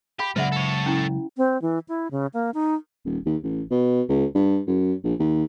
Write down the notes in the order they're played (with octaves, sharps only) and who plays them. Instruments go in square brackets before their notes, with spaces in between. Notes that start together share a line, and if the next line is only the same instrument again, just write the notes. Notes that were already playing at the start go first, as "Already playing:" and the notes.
[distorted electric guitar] G4 [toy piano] F5 B5
[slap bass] C#3 F#3 G#3 [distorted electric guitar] F4 D5 [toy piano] C5 E5 F#5
[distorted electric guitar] A4 C#5
[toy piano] C#4 E4
[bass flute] C4
E3
E4
C#3
A#3
D#4
[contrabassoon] D#1
D#2
A1
B2
C#2
G2
F#2
A#1
D#2